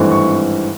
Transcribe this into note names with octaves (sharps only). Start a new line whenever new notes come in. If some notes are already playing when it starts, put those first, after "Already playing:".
Already playing: G#1 G2 E3 A3 C4
C#6